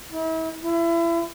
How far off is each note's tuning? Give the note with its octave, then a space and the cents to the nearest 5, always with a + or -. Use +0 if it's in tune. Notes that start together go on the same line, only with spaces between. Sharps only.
E4 -40
E4 +30